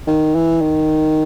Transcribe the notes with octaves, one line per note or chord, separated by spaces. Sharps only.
D#3
E3
D#3